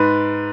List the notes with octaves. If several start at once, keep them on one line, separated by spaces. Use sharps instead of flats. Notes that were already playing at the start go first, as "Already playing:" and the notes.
Already playing: G#2 B4